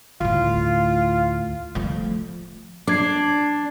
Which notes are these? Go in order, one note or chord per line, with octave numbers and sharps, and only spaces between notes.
D2 A2 F4
F3 A3
D4 D6 G#6 C7